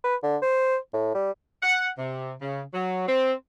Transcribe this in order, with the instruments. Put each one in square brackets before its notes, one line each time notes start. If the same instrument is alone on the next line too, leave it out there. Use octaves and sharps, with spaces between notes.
[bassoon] B4
D3
C5
A2
G3
[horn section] F#5
C3
C#3
F#3
C4